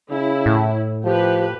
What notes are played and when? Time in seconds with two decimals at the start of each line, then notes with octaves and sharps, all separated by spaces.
0.11 C#3 E4
0.46 A2
1.04 F3 G4 B4